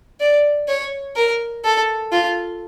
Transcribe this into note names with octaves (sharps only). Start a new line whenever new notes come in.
D5
C#5
A#4
A4
F4